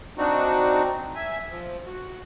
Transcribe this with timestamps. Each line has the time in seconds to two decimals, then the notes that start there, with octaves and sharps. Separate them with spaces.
0.18 C4 D4 D#4 F#4
1.15 E5 G#5
1.50 F3
1.86 F#4